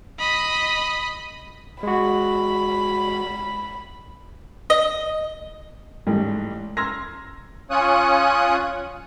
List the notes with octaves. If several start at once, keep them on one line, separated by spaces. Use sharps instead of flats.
D#5 B5
G#3 F#4 B5
D#5
A1 G#2 G3 A3
A#5 C6 E6 F6 G#6 A#6
C#4 F4 C#5 D#6 F#6